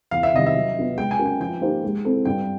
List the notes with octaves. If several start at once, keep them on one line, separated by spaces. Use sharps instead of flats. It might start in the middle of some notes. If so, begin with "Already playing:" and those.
E2 F5
E5
C3 D#3 G3 D#5
E5
F#3
B3 D4 F4
G#3 G5
G#5
C#4 F#4 A#4
G5
F3 G5
A#3 D#4 G4 C5
G#3
C4 E4 A4
G2 G5